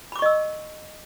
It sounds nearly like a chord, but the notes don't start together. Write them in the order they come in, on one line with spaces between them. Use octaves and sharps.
B5 D6 C#6 D#5 E6